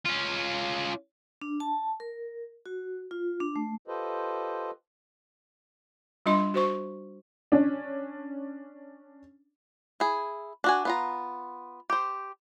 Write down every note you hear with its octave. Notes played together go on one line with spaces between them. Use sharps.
C#4 F4
D4
A5
A#4
F#4
F4
D4
A3
F4 G4 A4 B4 C5 D#5
G3 D4 F4 D#5 C6
F#4 C5 C#6
C#4 D4
E4 G#4
D4 F#4 G#5
B3 F4 A#5
G4 C5